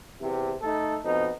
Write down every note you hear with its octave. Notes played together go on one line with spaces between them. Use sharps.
E2 C3
A3 D#4 A4
F2 B2 D#4